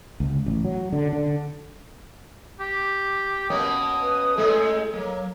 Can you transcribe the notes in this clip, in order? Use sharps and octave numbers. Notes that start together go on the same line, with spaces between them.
C#2
A1
F#3
D3
D3
G4
B2 A#3 C#4 D#6
B4
A2 G#3 G#4 A4
F#3 A#3